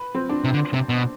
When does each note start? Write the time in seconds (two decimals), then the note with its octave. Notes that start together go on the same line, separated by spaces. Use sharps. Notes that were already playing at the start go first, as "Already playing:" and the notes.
Already playing: B4
0.15 C4
0.29 D4
0.44 C3
0.54 D3
0.74 C3
0.89 B2